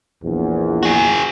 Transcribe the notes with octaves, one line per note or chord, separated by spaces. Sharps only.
A#1 E2
F#4 G#4